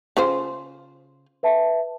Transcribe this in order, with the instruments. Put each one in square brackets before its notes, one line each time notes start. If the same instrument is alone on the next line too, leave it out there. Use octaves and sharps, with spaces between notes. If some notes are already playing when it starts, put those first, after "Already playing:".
[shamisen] C#3 F4 C5
[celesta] B4 E5 A5